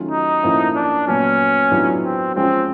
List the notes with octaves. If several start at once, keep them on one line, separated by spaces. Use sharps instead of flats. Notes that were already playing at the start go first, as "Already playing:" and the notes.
Already playing: D#3 F#3 A3 C#4 F4
D#4
A2 F3 A#3 C#4 E4
D4
A#2 F#3 B3 C#4
A2 F#3 B3 D4 F4
C4
F3 G#3 C4 C#4 F4